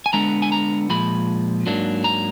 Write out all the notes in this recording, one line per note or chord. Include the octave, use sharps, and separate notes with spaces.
G#5
D3 G#3 B3 D4 A#5
G#5
A#5
A#2 F3 G#3 B5
G#2 F#3 A#3 D4
A#5